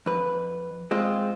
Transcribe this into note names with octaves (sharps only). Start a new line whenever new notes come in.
F2 B4
G#3 C4 F4